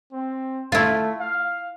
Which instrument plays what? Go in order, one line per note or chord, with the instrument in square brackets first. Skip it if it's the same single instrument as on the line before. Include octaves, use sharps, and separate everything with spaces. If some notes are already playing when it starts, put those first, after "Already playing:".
[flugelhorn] C4
[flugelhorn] A3 [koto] E4 F4
[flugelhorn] F5